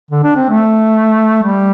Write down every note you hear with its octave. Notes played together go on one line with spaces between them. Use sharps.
D3
D4
C4
A3
G3